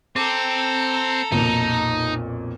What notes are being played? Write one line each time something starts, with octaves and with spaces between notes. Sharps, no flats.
C4 A4 A#5 D6 D#7
B1 F2 A#2 D#4